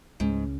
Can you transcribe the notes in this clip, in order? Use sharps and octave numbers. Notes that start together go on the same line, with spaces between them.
C#2 G#2 C#3 G#3 C#4